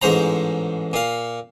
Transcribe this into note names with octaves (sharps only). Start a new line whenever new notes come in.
A1 G#2 C5 A#5
A#2 F5